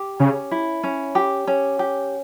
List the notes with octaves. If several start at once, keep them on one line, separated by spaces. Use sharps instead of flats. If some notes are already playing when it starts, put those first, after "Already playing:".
Already playing: G4
C#3 C#4
E4
C#4
G4
C#4
G4